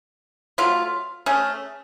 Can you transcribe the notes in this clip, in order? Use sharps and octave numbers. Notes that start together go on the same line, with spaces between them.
F#3 A3 F4
A3 C#4 G#4